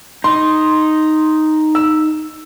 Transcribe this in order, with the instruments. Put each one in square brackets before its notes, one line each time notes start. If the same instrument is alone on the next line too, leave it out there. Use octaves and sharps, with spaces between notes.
[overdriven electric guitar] D#4 [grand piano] C6
[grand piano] E6